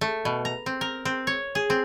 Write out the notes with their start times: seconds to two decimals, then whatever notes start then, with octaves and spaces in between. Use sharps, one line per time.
0.01 A3
0.25 B2
0.45 A#5
0.66 C4
0.81 A#4
1.05 C4
1.27 C#5
1.55 G#4
1.70 C4